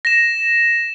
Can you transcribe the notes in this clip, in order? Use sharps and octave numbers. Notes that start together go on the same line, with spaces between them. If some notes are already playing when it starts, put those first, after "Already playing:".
A#6 E7